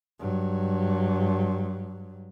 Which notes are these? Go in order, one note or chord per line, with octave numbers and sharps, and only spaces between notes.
G2 F#3